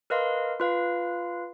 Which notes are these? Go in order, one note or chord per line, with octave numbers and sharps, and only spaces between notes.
A#4 B4 D#5 F5 C6
F4 B4 F5